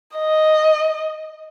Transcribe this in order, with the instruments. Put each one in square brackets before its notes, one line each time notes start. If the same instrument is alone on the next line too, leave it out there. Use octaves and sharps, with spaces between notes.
[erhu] D#5